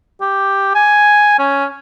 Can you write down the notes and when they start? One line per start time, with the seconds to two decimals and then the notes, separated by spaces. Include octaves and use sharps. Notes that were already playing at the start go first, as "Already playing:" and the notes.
0.22 G4
0.75 G#5
1.39 C#4